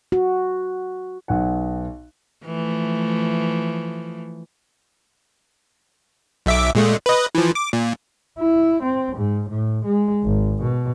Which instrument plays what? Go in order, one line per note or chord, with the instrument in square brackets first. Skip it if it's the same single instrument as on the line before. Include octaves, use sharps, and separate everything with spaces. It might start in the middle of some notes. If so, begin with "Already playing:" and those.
[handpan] F#4
[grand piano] B1 F#5
[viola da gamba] E3 F3 A3
[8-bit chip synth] B1 E5 D6
A#2 G#3 A3
B4 D#5
E3 F3
D6
A#2
[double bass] E4
C4
G#2
A2
G#3
G#1
B2